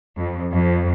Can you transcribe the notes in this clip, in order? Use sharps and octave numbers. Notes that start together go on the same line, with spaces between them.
F2
F2